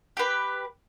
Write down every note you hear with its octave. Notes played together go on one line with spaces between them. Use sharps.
G4 B4